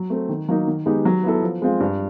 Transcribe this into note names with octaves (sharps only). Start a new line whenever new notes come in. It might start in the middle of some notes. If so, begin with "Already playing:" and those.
Already playing: F#3
A3 C4
D#3
F#3 A#3 D#4
D#3
G#3 B3 D#4 G4
F#3
B3 E4 A4
F3
G#3 C4 F4
G2